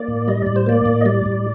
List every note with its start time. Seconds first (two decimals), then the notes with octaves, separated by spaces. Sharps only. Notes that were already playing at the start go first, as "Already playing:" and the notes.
Already playing: A#3 D5
0.08 A2
0.27 G3 D#5
0.42 A2 D5
0.56 C5
0.66 A#3 D5
0.86 A2
1.01 D#5
1.05 G3 D5
1.26 A2